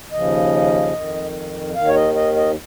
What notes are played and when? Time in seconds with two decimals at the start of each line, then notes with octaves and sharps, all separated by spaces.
0.12 D#2 C#3 F3 D#5
0.93 F2 D#3
1.74 D#2 D#3 F5
1.87 C#5
1.95 D#5
2.15 D#5
2.36 D#5